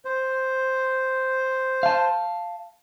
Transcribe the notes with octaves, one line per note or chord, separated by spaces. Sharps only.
C5
F5 A5